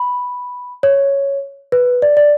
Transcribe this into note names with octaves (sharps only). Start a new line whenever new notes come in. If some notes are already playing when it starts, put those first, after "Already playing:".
Already playing: B5
C#5
B4
D5
D5